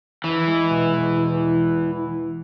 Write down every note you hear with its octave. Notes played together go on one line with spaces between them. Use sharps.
E2 E3
G#3
B2
E2
E2